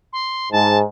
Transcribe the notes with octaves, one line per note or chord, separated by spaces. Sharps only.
C6
G#2 A5